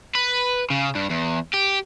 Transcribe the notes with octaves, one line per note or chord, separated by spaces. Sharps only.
B4
C#3
G2
E2
G4